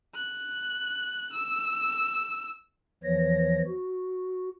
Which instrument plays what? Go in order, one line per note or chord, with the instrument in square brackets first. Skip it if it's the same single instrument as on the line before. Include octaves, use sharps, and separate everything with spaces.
[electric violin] F#6
E6
[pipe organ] E2 E3 F3 C#5 A#6
F#4